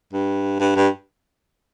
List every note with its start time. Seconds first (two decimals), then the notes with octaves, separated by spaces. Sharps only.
0.13 G2
0.59 G2
0.76 G2